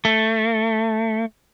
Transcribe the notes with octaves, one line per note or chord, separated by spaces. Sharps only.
A3